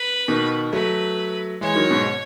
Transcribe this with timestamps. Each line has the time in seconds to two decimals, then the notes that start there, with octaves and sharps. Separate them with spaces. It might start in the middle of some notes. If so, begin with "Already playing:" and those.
Already playing: B4
0.28 B2 D#3
0.73 F#3 A3 B4
1.61 E3 G#3 C#5
1.76 D#3 F#3
1.91 G#2 B2